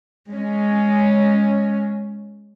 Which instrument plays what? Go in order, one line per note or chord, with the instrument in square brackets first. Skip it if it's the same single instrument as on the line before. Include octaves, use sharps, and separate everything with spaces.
[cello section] G#3 C#4